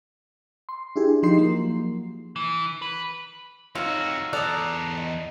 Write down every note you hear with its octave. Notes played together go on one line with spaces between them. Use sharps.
C6
D4 E4 G4 G#4
F3 D#4 G4 C6 C7
F3 F#3 A#3
E3
B4
F2 D#4 F4 F#4 C#5 E6 F6
E2 A4 C5 D5 A#5 D#6 F#6
D#5